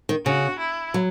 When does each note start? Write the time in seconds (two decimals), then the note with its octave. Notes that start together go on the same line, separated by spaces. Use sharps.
0.09 D#3
0.26 C#3 F#4
0.59 E4
0.94 F#3